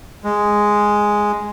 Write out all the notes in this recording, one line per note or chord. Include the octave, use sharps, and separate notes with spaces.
G#3